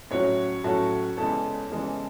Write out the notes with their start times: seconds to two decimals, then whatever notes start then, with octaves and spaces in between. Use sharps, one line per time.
0.11 A2 F#3 C#4 F#4 C#5
0.64 A2 F#3 C#4 F#4 A4
1.17 E2 C#3 E3 G#3 A4
1.70 E2 C#3 E3 G#3